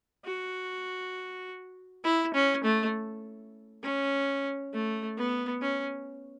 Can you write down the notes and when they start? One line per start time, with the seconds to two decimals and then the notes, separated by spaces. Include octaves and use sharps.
0.25 F#4
2.04 E4
2.34 C#4
2.64 A3
3.83 C#4
4.73 A3
5.17 B3
5.62 C#4